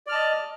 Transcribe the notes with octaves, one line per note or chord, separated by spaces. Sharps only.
D5 D#5 A5 F6